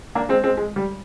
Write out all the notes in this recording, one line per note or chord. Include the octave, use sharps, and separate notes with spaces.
A#3 D4
G#3 C4
G#3 C4
G#3
G3